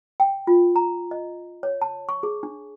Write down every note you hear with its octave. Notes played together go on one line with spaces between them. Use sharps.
G5
F4
A#5
D#5
C#5
A5
C#6
G#4
D4